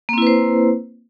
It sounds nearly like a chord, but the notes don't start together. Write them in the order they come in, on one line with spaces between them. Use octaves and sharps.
A#3 C4 E4 B4 C5